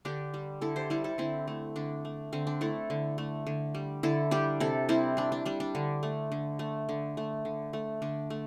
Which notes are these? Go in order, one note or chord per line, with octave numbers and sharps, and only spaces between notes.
D3 D4 G4
G3
D3 E4 A4
G4 C5
G3 E4 A4
E4 A4
D3 C4 E4
A3
D3 D4
A3
D3 C4
D4
A3 E4 A4
D3
A3
D3
G3
D3 E4 A4
G3 D4 G4
C3 E4 A4
G3 C4 E4
C3 D4
D4
G3 D4
D4
D3
A3
D3
A3
D3
A3
D3
A3
D3 D4
A3